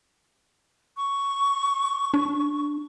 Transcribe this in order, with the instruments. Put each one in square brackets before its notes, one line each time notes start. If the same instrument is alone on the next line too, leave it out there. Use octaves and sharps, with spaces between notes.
[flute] C#6
[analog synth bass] D4